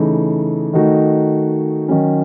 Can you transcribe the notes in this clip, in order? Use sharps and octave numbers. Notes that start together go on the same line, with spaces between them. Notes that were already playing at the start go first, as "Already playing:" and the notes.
Already playing: C#3 E3 A3 D#4
D#3 A3 D#4 F#4
D#3 F#3 C#4